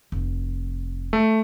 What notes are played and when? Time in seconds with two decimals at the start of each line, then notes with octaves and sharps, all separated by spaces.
0.12 F1
1.13 A3